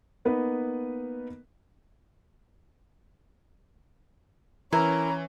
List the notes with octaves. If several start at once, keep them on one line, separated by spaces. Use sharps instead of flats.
A#3 B3 D#4 B4
E3 C#4 E4 A#4 A#5